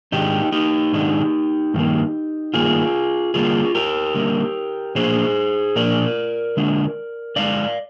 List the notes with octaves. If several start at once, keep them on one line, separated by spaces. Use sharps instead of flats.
G#2 D#3 G#3 D4 D#4 G4
D#4 G4
G#2 D#3 G#3 D4
G2 D#3 A#3
G2 D#3 A#3 F4 G#4
D3 G3 A#3 F4 G#4
G4 A#4
D3 G3 A#3
A#2 F3 A#3 D4 G#4 C5
A#2 F3 A#3 D4 A#4 D5
D3 G#3 D4
D3 G#3 D4 D5 F5